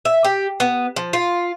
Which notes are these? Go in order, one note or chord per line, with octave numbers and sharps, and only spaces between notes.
E5
G4
B3
F3
F4